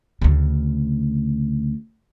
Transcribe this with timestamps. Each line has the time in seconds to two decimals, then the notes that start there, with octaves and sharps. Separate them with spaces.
0.22 D2 C#3